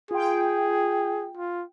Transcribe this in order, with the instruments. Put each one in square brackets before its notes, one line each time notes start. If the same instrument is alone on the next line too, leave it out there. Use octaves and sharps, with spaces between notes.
[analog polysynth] F4 G5 [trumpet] G#4
[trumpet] F4